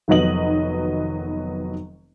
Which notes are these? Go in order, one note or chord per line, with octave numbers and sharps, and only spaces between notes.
F1 D#3 F#3 B3 D#5 F#7